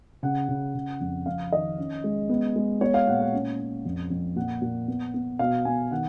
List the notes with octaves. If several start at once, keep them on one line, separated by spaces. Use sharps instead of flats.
C#3 F#5
C#3
C#3
F2
F2 F5
D#3 D#5
C#4
G#3
B3
G#3
B3 C#5
F5
A#2 F#5
F#5
C#4
C#4
F2
F2
A#2 F#5
A#2
B3
B3
B2 F5
B2 G#5
D#3 F#5